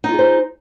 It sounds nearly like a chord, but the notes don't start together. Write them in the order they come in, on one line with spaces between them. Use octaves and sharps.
D#4 F4 G#4 C5